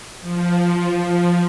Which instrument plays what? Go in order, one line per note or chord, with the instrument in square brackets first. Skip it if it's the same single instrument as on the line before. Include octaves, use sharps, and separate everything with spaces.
[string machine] F3